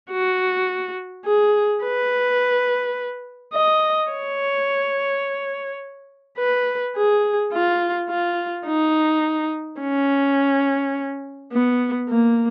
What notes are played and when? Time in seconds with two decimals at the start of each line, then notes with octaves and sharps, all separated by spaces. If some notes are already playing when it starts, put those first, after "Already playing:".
0.11 F#4
1.25 G#4
1.83 B4
3.54 D#5
4.11 C#5
6.39 B4
6.96 G#4
7.53 F4
8.10 F4
8.67 D#4
9.81 C#4
11.53 B3
12.09 A#3